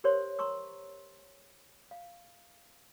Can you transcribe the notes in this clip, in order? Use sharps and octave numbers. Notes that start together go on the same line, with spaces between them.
G4 A#4 C5 C#5 C6
A#5 C6 C#6 E6
F5